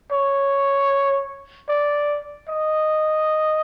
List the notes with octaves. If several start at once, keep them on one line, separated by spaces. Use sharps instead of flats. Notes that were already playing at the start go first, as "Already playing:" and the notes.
C#5
D5
D#5